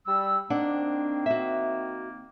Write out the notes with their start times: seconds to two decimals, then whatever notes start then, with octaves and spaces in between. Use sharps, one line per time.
0.07 G3 E6
0.50 D#3 A#3 C4 D4 F#5
1.26 F#4 E5